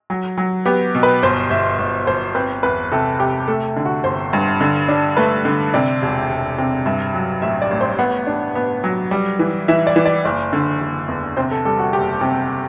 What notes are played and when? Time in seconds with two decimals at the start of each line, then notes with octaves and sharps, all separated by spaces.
0.10 F#3
0.38 F#3
0.66 B3 G4
0.95 B2
1.03 B4
1.23 G1 C5
1.50 G1 E5
1.79 G1
2.07 G1 C5
2.35 C4 B4
2.63 E2 B4
2.92 C3 A4
3.19 C3 G4
3.48 A3 A4
3.76 D3
3.85 F#4
4.04 G1 C5
4.33 G2
4.61 D3
4.89 D4
5.17 A3 B4
5.45 D3
5.74 C3 D5
6.02 E1
6.29 E1
6.58 C3
6.86 G2 E5
7.14 F#3
7.42 A1 E5
7.62 D5
7.71 A1
7.81 C5
7.99 B3 F#5
8.27 D4
8.55 B3
8.84 F#3
9.11 G3
9.39 E3
9.68 E3 E5
9.87 D5
9.96 E3
10.06 D5
10.25 F#1 D5
10.53 D3
10.81 F#1
11.08 E2
11.37 C3 C5
11.51 A4
11.65 G3 A4
11.79 F#4
11.93 F#1 G4
12.21 C3